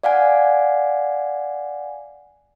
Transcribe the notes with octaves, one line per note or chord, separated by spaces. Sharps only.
D5 F5 F#5 G#5